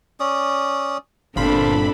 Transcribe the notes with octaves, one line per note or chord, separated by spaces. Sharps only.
C#4 D5 D#6
G1 A#2 C4 D4 A4 C5 F5 B5